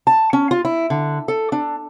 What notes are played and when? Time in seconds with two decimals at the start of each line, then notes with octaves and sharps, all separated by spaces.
0.07 A5
0.33 C#4
0.51 F4
0.65 E4
0.90 D3
1.28 A4
1.52 D4